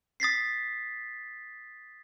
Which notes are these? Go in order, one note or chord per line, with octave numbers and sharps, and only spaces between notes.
D#6 A6 B6 C7